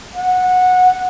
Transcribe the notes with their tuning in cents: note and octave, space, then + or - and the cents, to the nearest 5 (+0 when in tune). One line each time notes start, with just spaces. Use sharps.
F#5 -15